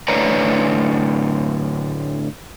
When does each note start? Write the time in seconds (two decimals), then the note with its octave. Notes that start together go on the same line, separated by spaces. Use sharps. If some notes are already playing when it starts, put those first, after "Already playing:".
0.08 A2 D3 B4 C#5 D5 A#5